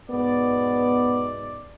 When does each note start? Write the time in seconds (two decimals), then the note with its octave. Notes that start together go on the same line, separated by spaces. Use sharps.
0.10 G#2 B2 B3 D5